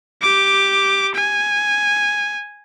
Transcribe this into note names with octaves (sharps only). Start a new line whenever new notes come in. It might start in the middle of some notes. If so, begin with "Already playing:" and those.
G4 D6
G#5